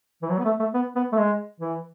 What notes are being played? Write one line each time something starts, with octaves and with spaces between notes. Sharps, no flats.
E3
F#3
B3
A3
A3
B3
B3
A3
G#3
E3